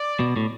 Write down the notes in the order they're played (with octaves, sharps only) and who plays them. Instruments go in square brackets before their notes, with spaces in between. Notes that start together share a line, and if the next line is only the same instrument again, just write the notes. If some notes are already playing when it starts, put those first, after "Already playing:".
Already playing: [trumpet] D5
[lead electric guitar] B2
A2